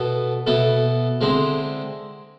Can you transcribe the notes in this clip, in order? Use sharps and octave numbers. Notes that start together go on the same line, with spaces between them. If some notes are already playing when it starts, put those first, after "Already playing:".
Already playing: B2 B3 E4 A4
B2 B3 E4 A4
D3 G#3 C4 E4